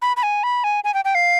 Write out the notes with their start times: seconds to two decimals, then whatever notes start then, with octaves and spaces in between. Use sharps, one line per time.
0.02 B5
0.17 B5
0.23 G#5
0.43 B5
0.64 G#5
0.84 G#5
0.94 G5
1.05 G5
1.15 F5